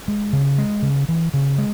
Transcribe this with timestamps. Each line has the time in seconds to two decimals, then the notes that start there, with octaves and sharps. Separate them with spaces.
0.08 G#3
0.33 C#3
0.58 G#3
0.82 C#3
1.09 E3
1.34 C#3
1.58 G#3